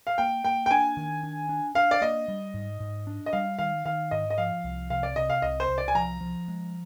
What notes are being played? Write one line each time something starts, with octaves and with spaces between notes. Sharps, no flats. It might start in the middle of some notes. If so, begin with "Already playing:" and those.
F5
A#3 G5
A#3 G5
G5
D4 G#5
D#3
D4
D4
D4 F5
D5
A#3 D#5
G3
G#2
G#2
D4
D#5
G3 F5
D#3 F5
D#3 F5
G#2 D#5
D#5
F3 F5
C2
C3 F5
D5
C3 D#5
F5
C2 D#5
C5
C2
D5
G#5
F3 A#5
F3
G#3